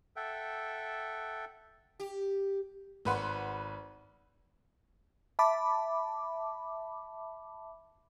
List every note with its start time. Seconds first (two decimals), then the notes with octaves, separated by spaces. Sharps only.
0.16 A4 E5 F#5 G5
2.00 G4
3.05 G#1 B4 F#5 C6
5.39 E5 A5 B5 D6